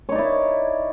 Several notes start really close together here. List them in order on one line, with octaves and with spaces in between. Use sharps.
C#5 D#4 D5 E4